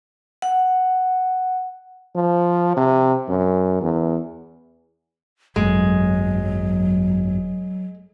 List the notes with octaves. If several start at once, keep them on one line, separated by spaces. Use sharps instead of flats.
F#5
F3
C3
F#2
E2
G#1 F#2 F#3 G#3